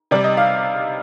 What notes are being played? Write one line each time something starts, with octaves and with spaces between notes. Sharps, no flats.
C3 G3 D5
D#5
F5